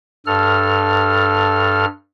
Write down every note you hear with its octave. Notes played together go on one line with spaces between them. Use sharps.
G2 A4 F6